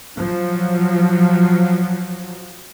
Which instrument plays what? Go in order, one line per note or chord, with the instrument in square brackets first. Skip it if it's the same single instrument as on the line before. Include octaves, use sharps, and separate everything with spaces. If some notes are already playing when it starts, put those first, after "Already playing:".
[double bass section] F3 F#3